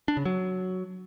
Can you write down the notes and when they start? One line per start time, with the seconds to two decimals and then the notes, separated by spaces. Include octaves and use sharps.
0.08 D4
0.17 C#3
0.25 F#3